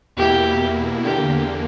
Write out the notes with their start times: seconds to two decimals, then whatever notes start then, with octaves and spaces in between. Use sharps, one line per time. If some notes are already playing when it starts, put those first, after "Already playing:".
0.17 E2 B2 A#3 E4 G4
1.04 E2 D3 A#3 G4